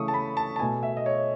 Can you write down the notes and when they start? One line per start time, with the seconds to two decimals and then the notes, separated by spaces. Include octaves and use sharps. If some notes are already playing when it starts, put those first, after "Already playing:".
Already playing: C#3 E3 A3 C#6 D#6
0.08 A5
0.14 B5
0.37 A5
0.56 A5
0.60 B2 A3 G#5
0.83 E5
0.97 D#5
1.06 C#5